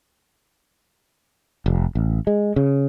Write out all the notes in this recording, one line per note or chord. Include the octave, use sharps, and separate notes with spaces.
F1
A1
G#3
C#3